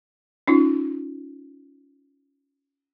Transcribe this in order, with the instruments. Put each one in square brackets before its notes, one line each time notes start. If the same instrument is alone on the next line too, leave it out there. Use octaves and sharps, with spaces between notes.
[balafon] C#4 D#4 F4